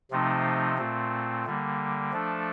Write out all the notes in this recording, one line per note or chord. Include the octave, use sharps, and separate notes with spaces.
C3 F3 A3 C4 D#4
A#2 A3 C4
D3 G3 A#3
F3 A3 D4 A4